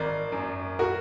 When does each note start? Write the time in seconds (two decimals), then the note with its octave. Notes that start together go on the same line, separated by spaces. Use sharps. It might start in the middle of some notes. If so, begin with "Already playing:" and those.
Already playing: G#1 A#4 D5
0.32 F#2
0.79 F#4 A#4